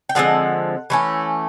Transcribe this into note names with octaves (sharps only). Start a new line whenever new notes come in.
G5
D3 F3 G#3 C4 F#5
E3 A3 C#4